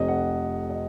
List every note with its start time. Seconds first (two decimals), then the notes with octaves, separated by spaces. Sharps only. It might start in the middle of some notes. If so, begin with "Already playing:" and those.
Already playing: F1 F2 C3 D#5
0.08 F#5
0.70 D#5